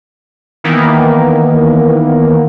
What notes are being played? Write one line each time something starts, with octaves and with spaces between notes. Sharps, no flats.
D#3 E3 A#3 B3